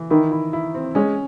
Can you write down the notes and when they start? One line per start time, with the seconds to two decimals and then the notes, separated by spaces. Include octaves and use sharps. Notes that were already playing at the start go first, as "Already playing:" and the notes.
Already playing: E3
0.10 D#3 E4
0.32 E4
0.53 E4
0.74 C4
0.95 G#3 C#4